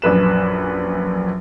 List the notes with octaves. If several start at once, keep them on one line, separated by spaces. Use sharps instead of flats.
A#1 F#2 B4 E7